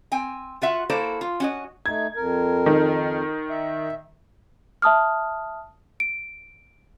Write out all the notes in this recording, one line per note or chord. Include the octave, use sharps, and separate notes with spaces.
C4 G5 G#5
F4 F#4 E5 F#5
A#3 E4 F#4 A4 C5 D5
F4
C#4 F#4 D#5
A3 D#4 G#6
F2 A#4
D#3
E5
E5 A5 D#6 F6
D7